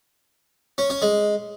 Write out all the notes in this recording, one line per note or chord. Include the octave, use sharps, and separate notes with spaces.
C#4
C#4
G#3